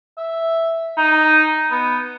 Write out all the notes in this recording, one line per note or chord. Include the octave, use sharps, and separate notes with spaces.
E5
D#4
B3